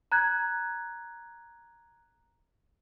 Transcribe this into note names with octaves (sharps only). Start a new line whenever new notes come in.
A#5 F#6 G#6